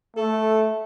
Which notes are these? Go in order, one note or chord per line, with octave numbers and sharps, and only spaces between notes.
A3 A4